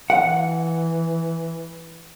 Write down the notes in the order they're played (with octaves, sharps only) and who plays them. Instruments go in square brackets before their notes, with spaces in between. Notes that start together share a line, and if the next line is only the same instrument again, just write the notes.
[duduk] E3 [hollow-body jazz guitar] F#5